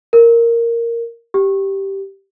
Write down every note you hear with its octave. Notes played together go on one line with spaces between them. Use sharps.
A#4
G4